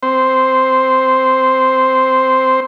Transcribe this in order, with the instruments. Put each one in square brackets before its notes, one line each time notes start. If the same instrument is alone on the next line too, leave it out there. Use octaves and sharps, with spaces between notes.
[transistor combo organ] C4 C5